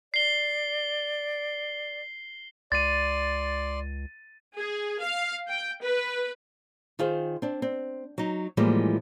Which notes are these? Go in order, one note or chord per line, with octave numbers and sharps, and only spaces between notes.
D5 C7 G7
C#2 D5 C6 A6 D#7
G#4
F5
G5
B4
D#3 F4 G#4 C5
C4 D4
C4
F#3 D#4
A2 E3 F3 G3 G#3 A#3